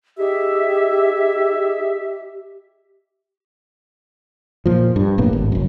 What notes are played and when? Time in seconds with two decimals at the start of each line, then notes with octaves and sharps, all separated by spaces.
0.18 D#4 G4 G#4 E5
4.66 A#2 F3
4.96 G2
5.18 F1 A2 A#3 B3
5.33 G#1
5.52 F#1 F#2